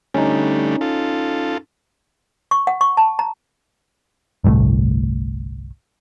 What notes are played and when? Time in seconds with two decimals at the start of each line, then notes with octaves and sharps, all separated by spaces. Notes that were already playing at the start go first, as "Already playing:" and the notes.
0.14 D3 G3 A3 C#4 D#4
0.81 F4 A4
2.51 C#6
2.67 F#5
2.81 C#6
2.97 A5
3.19 A#5
4.44 G1 C2 A2 A3